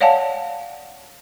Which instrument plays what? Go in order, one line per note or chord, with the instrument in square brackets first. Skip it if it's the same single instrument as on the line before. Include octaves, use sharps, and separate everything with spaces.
[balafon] C#5 D5 F5 F#5 G#5 A5